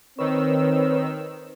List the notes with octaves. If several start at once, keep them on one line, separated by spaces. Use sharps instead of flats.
D#3 C4 B4 C#5 E6